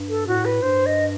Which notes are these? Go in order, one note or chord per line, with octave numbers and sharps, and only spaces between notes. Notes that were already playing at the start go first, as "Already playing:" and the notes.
Already playing: G2
A4
A2 F#4
B4
G2 C5
D#5